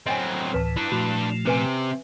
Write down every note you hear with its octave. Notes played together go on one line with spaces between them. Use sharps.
F#3 C4 D#5 G5 G#5
D2 A2 E3 B4 A5
D4 E4 B4
A#2 F3 A3 F#4
C3 C#4 B4 G#5